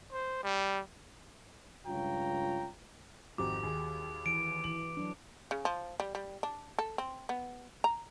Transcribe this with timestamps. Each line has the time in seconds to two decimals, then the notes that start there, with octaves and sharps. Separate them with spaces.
0.12 C5
0.44 G3
1.86 C#2 G2 F4 C#5 G5 A#5
3.38 G#1 F2 G#2 F#4 G4 D6
3.63 D#2 G#4
4.26 E3 D7
4.64 E3 F#7
4.97 F#3 D4
5.51 C#3
5.65 F3
6.00 G3
6.15 G3
6.43 D4
6.79 A4
6.98 C4
7.29 B3
7.84 A#5